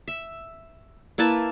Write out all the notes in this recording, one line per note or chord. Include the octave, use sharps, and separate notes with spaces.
E5
A#3 E4 B4 A5